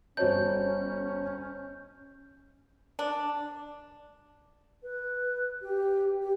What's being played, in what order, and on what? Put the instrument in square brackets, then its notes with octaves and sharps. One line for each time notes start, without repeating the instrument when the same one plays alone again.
[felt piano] G1 F#4 A5 [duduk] C#4 [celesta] C5 C#5 D#5 [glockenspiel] G6
[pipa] D4
[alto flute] B4
G4
G4